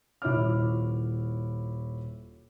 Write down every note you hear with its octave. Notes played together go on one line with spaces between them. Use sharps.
D#1 E4 F4 C#5 D6 F6